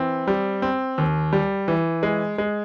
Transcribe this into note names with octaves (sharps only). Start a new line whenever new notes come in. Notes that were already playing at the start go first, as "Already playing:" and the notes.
Already playing: E3 C4
G3
C4
D#2
G3
E3
G#3
G#3